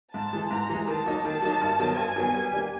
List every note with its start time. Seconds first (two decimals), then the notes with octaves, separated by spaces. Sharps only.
0.14 G#2 A5
0.33 E3 G#3
0.51 G#2 A#5
0.69 E3 G#3
0.87 D#3 A5
1.06 F#3 A#3 D#4
1.24 D#3 A5
1.42 F#3 A#3 D#4
1.61 G2
1.79 D#3 F#3 B3
1.97 G2 G#5
2.16 D#3 F#3 B3
2.34 G3
2.51 A#3 D4 G4